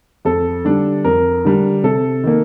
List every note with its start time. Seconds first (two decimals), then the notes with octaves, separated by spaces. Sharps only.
0.25 F2 A4
0.65 D3 G3 D4
1.05 F2 A#4
1.45 D3 G3 D4
1.84 C3 A4
2.24 D#3 A#3